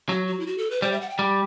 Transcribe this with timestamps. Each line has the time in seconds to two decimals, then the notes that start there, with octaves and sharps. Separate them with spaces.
0.09 F#3 F#4
0.27 F#4
0.40 E4
0.47 F#4
0.58 A4
0.71 B4
0.82 G3 C5
0.92 E5
1.01 F#5
1.10 G5
1.19 G3